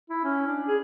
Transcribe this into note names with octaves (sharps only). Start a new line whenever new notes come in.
E4
C#4
D4
G#4